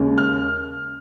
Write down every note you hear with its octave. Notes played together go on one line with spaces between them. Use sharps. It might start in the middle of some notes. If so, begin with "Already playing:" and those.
Already playing: D#2 C#3 G#3 C#4
F6